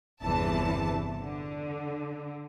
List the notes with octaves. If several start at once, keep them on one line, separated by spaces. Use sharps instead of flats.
G1 E2 C3 E3 A5
D3